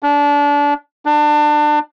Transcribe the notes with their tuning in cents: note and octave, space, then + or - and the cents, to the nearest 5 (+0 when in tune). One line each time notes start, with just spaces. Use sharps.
D4 -25
D4 +25